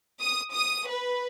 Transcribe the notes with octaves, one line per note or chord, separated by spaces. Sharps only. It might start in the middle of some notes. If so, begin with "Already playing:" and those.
D#6
D#6
B4